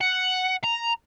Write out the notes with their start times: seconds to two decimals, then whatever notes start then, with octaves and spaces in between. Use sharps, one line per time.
0.01 F#5
0.64 A#5